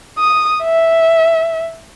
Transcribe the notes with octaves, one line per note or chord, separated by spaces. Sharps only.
D#6
E5